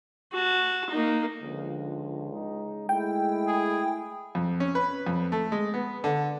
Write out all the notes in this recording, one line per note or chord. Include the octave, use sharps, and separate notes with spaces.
F#4 A5
A#3 D#4
C#2 D3 F3
G#3 D#4
G#3 A3 E4 G5
G#4
F2
C#4
B4
F2
A3
G#3
B3
D3